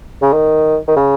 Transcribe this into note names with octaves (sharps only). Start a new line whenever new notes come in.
C#3
D#3
D#3
C#3